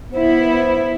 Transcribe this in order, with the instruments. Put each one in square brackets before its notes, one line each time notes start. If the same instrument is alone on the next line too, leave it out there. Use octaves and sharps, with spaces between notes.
[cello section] B3 E4 [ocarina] C5